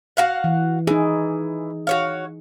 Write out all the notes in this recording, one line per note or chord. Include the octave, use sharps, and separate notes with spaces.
F#4 F5 F#5
E3
E3 D#4 G#4
F#4 C#5 F5